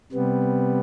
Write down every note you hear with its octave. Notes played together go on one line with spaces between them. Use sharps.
C3 G3 B3